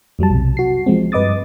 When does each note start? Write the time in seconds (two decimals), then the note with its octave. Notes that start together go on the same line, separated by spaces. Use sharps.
0.19 F2 F#3 G3 A5
0.30 B1 C3
0.57 F#4 C7
0.86 F3 G#3 C4
1.12 G2 B4 D#5 D6 D#6 A6